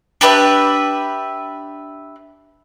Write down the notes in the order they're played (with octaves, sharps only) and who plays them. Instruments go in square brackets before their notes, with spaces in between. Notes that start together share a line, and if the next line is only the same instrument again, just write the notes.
[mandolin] D4 G4 B4 E5